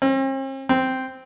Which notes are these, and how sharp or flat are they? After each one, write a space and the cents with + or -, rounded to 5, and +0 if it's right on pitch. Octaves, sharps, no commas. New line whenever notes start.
C4 +45
C4 -5